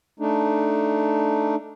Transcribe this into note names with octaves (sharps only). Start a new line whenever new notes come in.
A3 D4 D#4